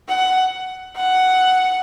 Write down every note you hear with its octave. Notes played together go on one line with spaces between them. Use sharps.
F#5
F#5